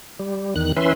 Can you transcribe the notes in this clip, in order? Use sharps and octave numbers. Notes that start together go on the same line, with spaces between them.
G3
E2 D#3 F#6
E3 C#4 B4 E5 C6